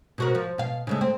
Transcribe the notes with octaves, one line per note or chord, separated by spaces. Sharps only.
B2 F#4 A#4
F3
B2 F5
C#3 G#3 A3
C4